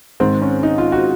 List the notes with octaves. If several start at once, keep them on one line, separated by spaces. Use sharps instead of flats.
G#2 D#3 C4
C#4
D#4
F4
F#4